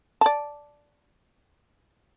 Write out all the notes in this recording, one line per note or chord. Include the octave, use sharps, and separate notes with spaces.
D5 A5